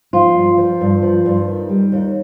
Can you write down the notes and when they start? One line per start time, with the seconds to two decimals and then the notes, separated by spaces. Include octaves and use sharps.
0.13 F3 F4
0.35 G2
0.58 F3
0.81 G2
1.02 F3
1.25 G2
1.48 D#3
1.69 G3
1.92 D#2